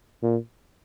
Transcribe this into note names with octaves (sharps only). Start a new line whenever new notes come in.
A#2